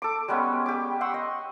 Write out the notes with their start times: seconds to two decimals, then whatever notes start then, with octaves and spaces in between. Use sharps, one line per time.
0.02 A4 D6
0.28 G3 G#3 B3 C#4
0.66 G4 D6
1.01 F#5 C6 C#6 E6
1.14 D#5